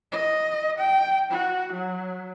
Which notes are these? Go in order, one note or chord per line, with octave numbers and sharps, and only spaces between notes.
D#5
G5
F#4
F#3